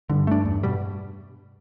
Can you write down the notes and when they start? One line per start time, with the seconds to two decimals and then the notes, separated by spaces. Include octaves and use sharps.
0.09 G2 D3
0.27 A3 D4
0.45 E2
0.63 B2 G3